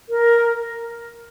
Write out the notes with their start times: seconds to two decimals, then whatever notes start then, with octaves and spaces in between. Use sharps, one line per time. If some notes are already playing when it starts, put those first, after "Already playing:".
0.09 A#4